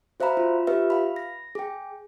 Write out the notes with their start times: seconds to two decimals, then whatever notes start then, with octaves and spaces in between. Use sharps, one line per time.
0.20 F#4 C5 E5 F5 A#5 B5
0.37 F4
0.67 F4 G4 B4 E5
0.90 F5 B5
1.16 A#6
1.55 G#4 G5